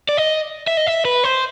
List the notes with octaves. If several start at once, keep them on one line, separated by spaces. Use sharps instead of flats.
D5
D#5
E5
D#5
E5
B4
C5